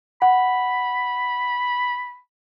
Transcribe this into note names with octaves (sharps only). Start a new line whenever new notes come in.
F#5 B5